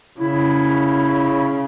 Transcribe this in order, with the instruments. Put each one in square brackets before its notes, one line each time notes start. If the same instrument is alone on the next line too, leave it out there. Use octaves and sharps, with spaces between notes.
[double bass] C#3 [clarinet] E4